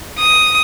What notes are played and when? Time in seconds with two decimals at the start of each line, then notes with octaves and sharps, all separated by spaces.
0.19 D#6